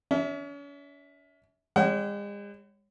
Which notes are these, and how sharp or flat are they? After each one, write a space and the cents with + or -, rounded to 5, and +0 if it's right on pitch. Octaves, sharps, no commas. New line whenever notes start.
C#4 +40 E5 -25
G#3 -40 C#5 +0 F#5 +45